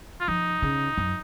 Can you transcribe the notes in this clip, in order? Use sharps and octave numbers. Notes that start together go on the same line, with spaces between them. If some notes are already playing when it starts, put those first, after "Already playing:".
F4
F3 D#4
C#3
F#2